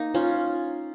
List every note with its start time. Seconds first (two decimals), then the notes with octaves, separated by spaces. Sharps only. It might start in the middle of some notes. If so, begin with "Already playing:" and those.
Already playing: A#3 D#4
0.14 C#4 F4